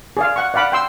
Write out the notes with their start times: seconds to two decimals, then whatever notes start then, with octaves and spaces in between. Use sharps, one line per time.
0.17 G#4 D5 F5
0.36 F#5 C#6
0.54 D5 F5 F#5 B5 D6
0.72 G5 C6 E6